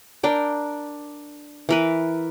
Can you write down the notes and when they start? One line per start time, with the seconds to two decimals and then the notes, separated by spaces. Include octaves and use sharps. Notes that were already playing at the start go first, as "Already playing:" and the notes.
0.23 D4 A#4 G5
1.69 E3 A#4 B4